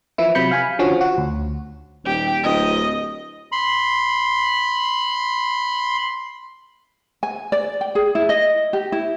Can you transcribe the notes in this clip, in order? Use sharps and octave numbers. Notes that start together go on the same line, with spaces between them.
E3 F3 E4
C3 F#3 B5 G6 C#7
F5 G#5 B5
D3 F3 C#4 F#4
F#4
D2
D#1 G4
D1 D#5
B5 C6
G#5
D5
G5
G#4
E4
D#5
G4
E4